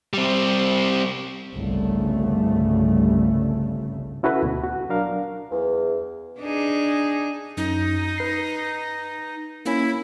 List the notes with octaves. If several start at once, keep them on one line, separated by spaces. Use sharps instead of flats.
G3 C4
G1 C2 C#3 A3
C#4 E4 F#4 A4 B4
D2 B2
F#4
F#3 D4 A#4 F5
E2
D4 D#4 G#4
F#2 D#4
B4 C7
A#3 C#4 E4